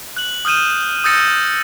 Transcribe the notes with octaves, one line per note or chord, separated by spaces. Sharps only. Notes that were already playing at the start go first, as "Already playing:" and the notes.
F#6 F#7
D#6 F6 G6 D#7 E7
D#6 E6 G6 A6 A#6 C#7